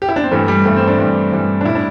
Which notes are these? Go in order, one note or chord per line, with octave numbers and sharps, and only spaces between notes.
G4
E4
D4
C4
G2 E3 G3 A3
G3
G2 E3 G3 A3
C4
D4
G2 E3 G3
G2 E3 G3
D4
A2 G3 E4
D4